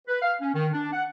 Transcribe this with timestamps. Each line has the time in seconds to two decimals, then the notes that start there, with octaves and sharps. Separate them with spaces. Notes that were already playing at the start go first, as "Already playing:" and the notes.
0.08 B4
0.22 F5
0.41 C#4
0.55 D#3
0.73 D4
0.93 F#5